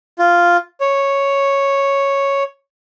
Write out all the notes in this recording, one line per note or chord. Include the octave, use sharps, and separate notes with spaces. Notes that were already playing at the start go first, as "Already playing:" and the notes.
F4
C#5